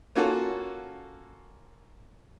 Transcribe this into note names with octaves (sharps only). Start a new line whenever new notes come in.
A#3 C#4 F4 F#4 A4